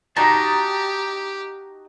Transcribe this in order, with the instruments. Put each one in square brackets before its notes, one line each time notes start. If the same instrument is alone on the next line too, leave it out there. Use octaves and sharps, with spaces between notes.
[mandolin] D#4 [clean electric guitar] F#4 D#5 A5 [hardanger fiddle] G4